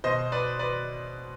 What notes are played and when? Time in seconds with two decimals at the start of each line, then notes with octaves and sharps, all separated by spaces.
0.04 B2 C5 D#5
0.32 B4 D5
0.59 B4 D5